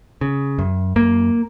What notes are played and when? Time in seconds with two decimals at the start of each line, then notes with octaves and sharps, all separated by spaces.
0.21 C#3
0.59 F#2
0.96 F#2 A#3